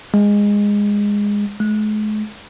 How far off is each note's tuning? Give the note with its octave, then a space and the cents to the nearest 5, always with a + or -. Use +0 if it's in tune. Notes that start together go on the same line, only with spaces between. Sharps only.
G#3 -15
G#3 +45